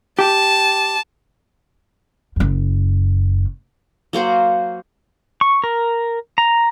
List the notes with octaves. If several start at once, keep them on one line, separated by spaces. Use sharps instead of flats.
G4 A5
F#1 F#2
F#3 A#3 C5 F#5
C#6
A#4
A#5